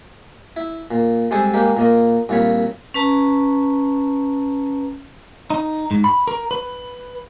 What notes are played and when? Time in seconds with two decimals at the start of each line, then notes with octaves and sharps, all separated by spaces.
0.56 E4
0.91 A#2
1.31 G3 G#3 C4 G#4 A4
1.54 G#3 A#3 G4
1.77 A#2 A#3 D#5
2.29 C2 A#2 F4 C#5 B5
2.94 C#4 B4 A5 A#5
5.50 D#4
5.91 G#2
6.04 B5
6.28 A#4
6.51 B4